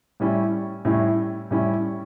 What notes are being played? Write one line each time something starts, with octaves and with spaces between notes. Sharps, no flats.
A2 G3 C#4 E4
A2 G3 C#4 E4
A2 G3 C#4 E4